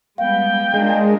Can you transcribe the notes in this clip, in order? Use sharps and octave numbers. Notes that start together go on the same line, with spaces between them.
G3 G#3 B3 F5 G5
G#3 D4 F4 A#4